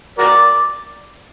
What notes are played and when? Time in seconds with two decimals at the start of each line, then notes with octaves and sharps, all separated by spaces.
0.18 F#4 A#4 D5